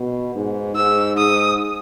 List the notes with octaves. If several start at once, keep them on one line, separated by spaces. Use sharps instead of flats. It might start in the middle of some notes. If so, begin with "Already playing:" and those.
Already playing: B2
G#2
G#2 E6
G#2 D#6